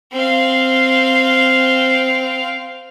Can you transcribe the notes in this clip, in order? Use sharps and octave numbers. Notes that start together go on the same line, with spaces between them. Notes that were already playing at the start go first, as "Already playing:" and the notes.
C4 F5